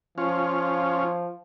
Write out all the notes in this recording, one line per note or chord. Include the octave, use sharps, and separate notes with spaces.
F3 C#4 F4